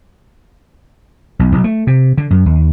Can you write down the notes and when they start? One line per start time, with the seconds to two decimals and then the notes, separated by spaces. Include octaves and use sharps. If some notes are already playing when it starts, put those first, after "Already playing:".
1.39 B1
1.52 B1
1.64 A3
1.87 C3
2.18 D3
2.30 F#2
2.46 D#2